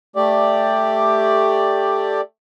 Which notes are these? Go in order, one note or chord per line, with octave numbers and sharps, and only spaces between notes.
A3 G4 D5